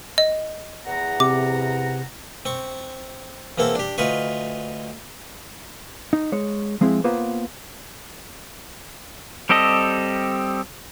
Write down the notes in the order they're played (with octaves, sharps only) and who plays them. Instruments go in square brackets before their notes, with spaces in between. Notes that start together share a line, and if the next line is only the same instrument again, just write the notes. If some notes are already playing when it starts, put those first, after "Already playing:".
[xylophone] D#5
[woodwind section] E2 F#5 A#5
[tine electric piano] C3 [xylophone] D6
[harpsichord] C4 C#6
E2 A#3 C4 A4 A5
D4 G4
D2 D#4 F4 B4 C#6
[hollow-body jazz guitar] D#4
G#3 C#5
F3 G#3 C4 E4
A#3 B3 F4 B4 C5
[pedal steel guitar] G3 C4 G4 A4 D#5